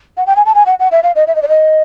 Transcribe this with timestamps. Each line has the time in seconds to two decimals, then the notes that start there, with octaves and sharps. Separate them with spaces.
0.17 F#5
0.27 G5
0.36 G#5
0.46 A5
0.55 G#5
0.66 F#5
0.79 F#5
0.91 E5
1.03 F5
1.15 D#5
1.27 E5
1.35 D#5
1.42 D5
1.48 D#5